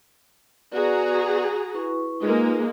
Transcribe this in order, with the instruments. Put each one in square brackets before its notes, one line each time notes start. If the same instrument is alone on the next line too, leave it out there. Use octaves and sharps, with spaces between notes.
[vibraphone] B3 B4 D5 [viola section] F#4 G#4 A#5
[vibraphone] E4 B4 C#6
[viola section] G#3 A#3 [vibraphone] D#4 F4 B4